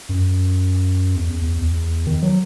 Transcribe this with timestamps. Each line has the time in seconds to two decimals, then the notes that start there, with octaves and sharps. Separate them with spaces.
0.09 F#2
1.16 E2
1.41 E2
1.62 E2
2.07 D#3
2.22 F#3